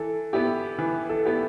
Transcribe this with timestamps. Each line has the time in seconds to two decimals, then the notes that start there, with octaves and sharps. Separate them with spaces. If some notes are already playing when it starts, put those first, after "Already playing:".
Already playing: E3 A4
0.33 B3 E4 G4
0.78 E3 B4
1.09 A4
1.25 B3 E4 G4